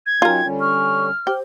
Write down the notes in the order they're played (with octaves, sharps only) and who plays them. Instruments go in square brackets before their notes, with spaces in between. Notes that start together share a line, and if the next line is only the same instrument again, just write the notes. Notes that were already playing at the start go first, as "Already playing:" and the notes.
[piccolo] G#6
[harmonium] F#3 C#4 D#4 [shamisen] F4 A#4 [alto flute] G5
[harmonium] D3 G3 C#4
[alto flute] C#6 [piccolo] F6
[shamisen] G4 [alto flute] C5